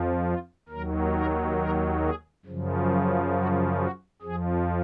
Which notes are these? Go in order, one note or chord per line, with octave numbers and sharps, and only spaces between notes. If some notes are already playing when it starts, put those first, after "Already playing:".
Already playing: F2 F3
F4
D#2 D#3 F#3 A#4
A#4
A#4
G#4
F#2 C#3 F3
F#4
F#4
F2 F3 G#4